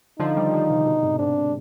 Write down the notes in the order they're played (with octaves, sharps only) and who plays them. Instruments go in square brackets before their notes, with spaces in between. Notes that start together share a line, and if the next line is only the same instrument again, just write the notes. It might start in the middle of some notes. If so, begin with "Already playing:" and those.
[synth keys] D3 F3 [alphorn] D#4
[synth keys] D#3 G3
D3 F3
C3 D#3
C3
B2 D3
G#2 C3
[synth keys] G#2 C3 [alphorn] D4
[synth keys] G#2